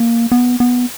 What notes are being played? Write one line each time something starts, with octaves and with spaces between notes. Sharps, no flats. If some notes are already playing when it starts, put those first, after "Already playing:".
Already playing: A#3
B3
B3